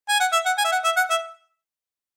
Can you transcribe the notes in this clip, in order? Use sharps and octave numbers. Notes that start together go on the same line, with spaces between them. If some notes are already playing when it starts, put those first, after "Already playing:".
G#5
F#5
E5
F#5
G#5
E5
F#5
E5
F#5
E5